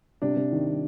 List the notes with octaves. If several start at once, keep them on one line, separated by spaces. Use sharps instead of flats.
C3 D4
C3
D#3
D#3